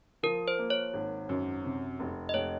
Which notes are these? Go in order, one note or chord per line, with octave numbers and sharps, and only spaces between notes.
F3 A#4
C5
A#3
C#5
G#1
F#2
C3
F1
D#5
F1 C#5